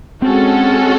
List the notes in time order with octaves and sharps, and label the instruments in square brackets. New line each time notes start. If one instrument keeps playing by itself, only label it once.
[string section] G#3 C#4 F#4 A4 [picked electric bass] C4